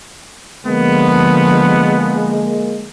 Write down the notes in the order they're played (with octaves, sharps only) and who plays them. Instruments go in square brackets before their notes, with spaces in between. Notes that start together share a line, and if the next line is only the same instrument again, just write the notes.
[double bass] D3 F3 [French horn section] G#3 A#3 [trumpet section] B3